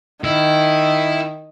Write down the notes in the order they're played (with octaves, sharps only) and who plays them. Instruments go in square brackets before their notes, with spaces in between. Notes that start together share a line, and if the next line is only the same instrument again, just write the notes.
[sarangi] D#3 [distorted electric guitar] E4